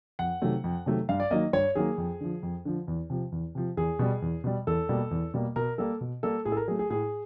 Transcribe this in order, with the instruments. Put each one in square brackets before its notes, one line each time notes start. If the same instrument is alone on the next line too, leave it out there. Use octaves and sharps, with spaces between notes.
[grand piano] F2 F#5
C3 D#3 F#3 A3
F2
C3 D#3 F#3 A3
G2 F5
D5
D#3 F#3 A#3 D#5
G2 C#5
D#3 F#3 A#3 G#4
F2
D3 F3
F2
D3 F3
E2
C3 F3
E2
C3 F3
E2 G#4
B2 G3
E2
B2 G3
E2 A4
B2 G3 A#3
E2
B2 G3 A#3
B2 A#4
G3 A#3 A4
B2
G3 A#3 A4
A2 G#4
A4
A#4
F#3 G#4
A3
G#4
A2 G#4